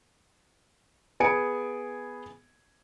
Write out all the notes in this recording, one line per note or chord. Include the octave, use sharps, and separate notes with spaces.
B3 G#4 G#5 C#7 D7